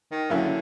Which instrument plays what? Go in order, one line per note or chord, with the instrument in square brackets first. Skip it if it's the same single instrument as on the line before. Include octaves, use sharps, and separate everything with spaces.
[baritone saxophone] D#3
[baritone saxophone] D3 [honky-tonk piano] F#3 A#3 C#4 E4